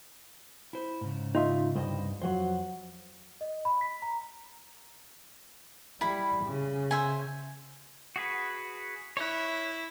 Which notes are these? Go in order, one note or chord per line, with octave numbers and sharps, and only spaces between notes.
E4 C5
G#2 C#3
D#4 F4 E5
C2 G2 G3 C5 D#5
F2 F#3 C5 F#5
D#5
B5
B6
A#5
G3 E4 B5
C#3
C5 E5 G#5
F#4 G#4 B4
E4 C#5 F#6